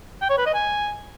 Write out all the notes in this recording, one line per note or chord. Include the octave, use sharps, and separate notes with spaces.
G5
C#5
B4
D#5
G#5